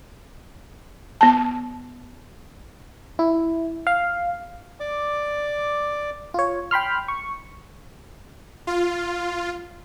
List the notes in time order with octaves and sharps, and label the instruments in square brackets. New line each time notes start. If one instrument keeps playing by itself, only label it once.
[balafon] B3 A5
[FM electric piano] E4
F5
[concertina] D5 D6
[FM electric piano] F4 C#5
G5 B5 C6 F6
C#6
[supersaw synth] F4